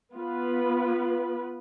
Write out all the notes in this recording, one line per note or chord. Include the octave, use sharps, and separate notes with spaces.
B3 F4 B4